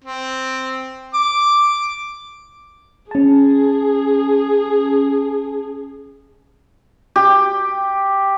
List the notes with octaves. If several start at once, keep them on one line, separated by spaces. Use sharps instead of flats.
C4
D6
C#4 G#4 A5
G4